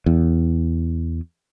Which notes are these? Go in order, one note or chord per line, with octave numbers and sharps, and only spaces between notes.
E2